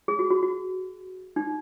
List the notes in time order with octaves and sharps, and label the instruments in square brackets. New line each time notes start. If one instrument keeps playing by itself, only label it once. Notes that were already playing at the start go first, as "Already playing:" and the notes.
[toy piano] G#4
F#4
F#4
F#4
D#4